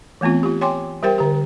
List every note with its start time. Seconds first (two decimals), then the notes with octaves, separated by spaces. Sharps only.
0.21 E3 A3 B3 C4 F4
0.43 F4 G4
0.61 C#5 G5 G#5 C6 D6
1.03 G3 G4 A#4 C5 G5
1.18 D3 G4